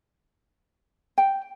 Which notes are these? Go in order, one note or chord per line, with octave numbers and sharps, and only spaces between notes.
G5